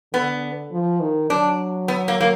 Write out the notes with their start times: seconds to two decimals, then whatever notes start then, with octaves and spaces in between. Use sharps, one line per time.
0.13 D3 B3
0.72 F3
1.01 D#3
1.30 F#3 D4
1.88 B3
2.08 A#3
2.20 A#3